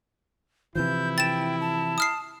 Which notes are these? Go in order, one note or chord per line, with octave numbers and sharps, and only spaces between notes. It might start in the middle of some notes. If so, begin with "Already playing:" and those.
C3 E3 F3 E4 G6
G5 A6 E7
A5
D#6 F6 C7